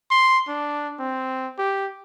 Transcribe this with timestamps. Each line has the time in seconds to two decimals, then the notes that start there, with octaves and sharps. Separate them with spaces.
0.11 C6
0.48 D4
1.00 C4
1.58 G4